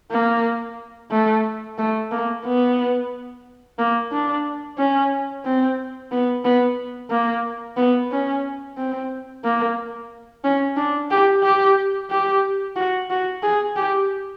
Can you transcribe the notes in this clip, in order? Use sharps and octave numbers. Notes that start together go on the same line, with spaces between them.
A#3
A3
A3
A#3
B3
A#3
D4
C#4
C4
B3
B3
A#3
B3
C#4
C4
A#3
C#4
D4
G4
G4
G4
F#4
F#4
G#4
G4